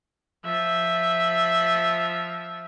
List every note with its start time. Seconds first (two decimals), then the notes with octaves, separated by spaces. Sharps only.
0.44 F3 E5